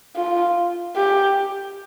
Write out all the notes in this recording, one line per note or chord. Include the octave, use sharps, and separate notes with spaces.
F4
G4